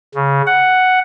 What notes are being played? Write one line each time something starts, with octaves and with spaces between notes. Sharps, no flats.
C#3
F#5